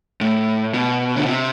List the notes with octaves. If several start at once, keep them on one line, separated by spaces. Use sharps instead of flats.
A2
B2
D3
C3